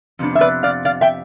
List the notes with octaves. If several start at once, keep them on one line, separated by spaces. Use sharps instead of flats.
F2 C3 B3 D4
E5
B4 D5
D5 F5
D5 F5
E5 G5